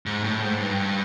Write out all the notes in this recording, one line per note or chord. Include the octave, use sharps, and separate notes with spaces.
G#2
A2
G#2
G2